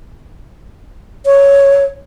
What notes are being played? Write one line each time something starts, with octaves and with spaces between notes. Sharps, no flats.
C#5